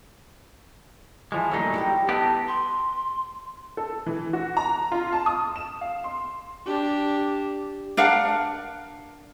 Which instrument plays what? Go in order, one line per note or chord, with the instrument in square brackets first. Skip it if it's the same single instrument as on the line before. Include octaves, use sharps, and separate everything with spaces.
[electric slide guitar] E3 F3 G#3
[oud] D3 A3 A#3 [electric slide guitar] F#3 G3 D#4
[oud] E4 F4 G4
[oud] E3 A4 [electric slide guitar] B3 D#4 G4
[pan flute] C6
[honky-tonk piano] A4
E3
F#4
A#5
F4
A5
D#6
E7
F5
C6
[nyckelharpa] D4 G4
[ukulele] D4 A#4 F5 F#5